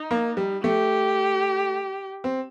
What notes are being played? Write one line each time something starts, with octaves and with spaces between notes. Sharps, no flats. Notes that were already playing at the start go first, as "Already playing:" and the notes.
Already playing: D#4
A#3
G3
A3 G4
C4